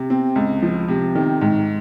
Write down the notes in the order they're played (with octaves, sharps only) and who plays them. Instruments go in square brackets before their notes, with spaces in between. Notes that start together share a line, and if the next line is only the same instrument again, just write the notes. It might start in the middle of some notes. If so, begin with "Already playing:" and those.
Already playing: [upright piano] C3
C4
C#2
F3
C3
D#3
G#2